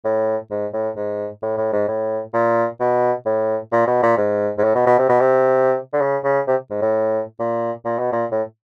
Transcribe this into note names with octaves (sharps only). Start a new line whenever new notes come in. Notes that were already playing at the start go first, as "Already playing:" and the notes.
A2
G#2
A2
G#2
A2
A2
G#2
A2
A#2
B2
A2
A#2
B2
A#2
G#2
G#2
A2
B2
B2
C3
B2
C3
D3
C#3
C#3
C3
G#2
A2
A#2
A#2
B2
A#2
A2